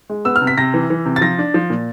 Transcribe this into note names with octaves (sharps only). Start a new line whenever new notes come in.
G#3
B3 E6
F6
C3
B6
C3 A#6
E3
E3
C3
A6
F3 A#6
D4
F3
A#2